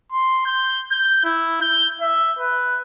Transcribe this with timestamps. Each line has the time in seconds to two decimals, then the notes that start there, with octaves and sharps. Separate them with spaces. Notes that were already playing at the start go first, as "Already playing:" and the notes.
0.12 C6
0.46 G6
0.91 G6
1.24 E4
1.62 G6
2.01 E5
2.39 B4